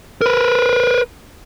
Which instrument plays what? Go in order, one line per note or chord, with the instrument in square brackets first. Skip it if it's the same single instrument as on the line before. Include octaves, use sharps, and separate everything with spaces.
[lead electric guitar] A#4 B4